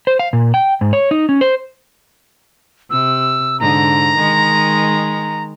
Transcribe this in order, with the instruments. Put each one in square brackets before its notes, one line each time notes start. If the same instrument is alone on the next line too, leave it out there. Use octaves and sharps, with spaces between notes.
[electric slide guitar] C5
F5
A#2
G5
G#2
C#5
D#4
C#4
C5
[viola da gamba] C3 [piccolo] E6
[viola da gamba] G#2 D3 [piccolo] A#5
[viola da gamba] D#3 G#3